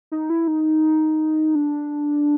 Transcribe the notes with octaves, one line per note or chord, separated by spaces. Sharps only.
D#4
E4
D#4
D4